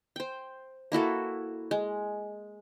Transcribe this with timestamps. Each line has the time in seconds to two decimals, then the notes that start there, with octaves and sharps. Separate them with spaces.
0.16 C5 G5
0.92 A#3 E4 F#4 A4
1.71 G#3